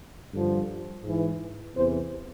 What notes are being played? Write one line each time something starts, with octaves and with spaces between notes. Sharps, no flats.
G2 D3 F3
G#2 E3
E2 C3 E3 C5